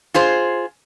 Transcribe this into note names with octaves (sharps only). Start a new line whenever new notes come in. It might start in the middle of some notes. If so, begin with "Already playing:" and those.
F4 G#4 C5